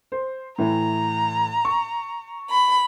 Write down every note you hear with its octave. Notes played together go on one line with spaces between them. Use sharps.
C5
A2 E3 A#5
C#6
B5